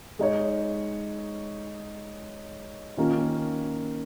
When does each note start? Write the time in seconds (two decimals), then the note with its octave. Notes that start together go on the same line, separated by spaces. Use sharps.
0.19 G#3 D#4 C#5
2.97 D#3 A#3 C#4 F4 A#4